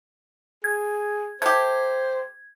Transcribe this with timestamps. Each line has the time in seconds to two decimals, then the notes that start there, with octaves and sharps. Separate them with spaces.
0.64 G#4 G#6
1.42 A3 G4 C5 G#6